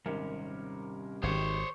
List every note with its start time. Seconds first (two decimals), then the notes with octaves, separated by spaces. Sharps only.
0.06 G#1 C3 G3 C#4 A#4
1.23 G#1 D#3 G4 C5 C#5 G#6